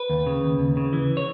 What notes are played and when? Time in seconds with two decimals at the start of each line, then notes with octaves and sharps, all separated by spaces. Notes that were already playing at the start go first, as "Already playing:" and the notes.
Already playing: B4
0.10 D#2
0.27 C#3
0.43 D#2
0.59 D#2
0.77 C#3
0.93 E3
1.17 C#5